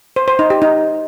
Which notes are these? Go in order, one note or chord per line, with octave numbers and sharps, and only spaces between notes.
C5
C5
D#4
G4
D#4